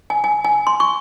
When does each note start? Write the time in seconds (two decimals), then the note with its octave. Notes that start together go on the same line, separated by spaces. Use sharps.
0.10 G#5
0.24 G#5
0.45 G#5
0.67 C6
0.80 C#6